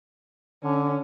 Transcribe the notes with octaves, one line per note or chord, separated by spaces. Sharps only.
D3 C#4